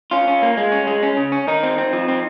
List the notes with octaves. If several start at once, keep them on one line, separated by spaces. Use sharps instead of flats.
C#4 F4
C#4
A#3
G#3
C#4
G#3
C#4
C#3
C#4
D#3 D#4
C4
C4
F3
C4